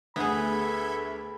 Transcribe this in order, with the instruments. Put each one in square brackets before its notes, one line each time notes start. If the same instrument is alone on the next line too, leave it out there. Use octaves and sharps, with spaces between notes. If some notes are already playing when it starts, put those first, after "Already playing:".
[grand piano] D2 [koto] B3 G#4 [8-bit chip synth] A4 E5 G#6 [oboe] B5